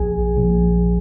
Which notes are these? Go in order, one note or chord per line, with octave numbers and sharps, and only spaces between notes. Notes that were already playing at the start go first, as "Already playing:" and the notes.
Already playing: A#1 G#4 G#5
A#1